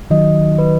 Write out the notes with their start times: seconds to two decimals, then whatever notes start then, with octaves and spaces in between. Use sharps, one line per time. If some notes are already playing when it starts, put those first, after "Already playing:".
0.10 D#3 F#3 D#5
0.58 B4